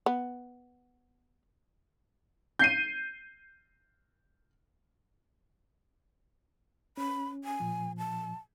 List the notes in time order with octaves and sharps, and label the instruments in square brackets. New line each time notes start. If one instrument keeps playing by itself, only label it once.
[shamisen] B3
[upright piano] G6 C7 D#7
[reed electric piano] C#4 [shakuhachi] B5
[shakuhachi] G#5
[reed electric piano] A#2 F3
[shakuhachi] A5